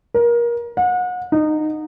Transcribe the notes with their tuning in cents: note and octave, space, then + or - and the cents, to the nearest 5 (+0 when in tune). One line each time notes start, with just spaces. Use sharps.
A#4 +25
F#5 -35
D#4 -20